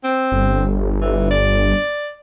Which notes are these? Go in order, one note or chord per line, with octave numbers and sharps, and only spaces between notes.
C4
G1
E3
D5